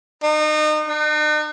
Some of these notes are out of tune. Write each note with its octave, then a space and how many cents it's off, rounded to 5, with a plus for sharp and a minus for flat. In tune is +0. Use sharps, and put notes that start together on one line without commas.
D#4 -30
D#4 -45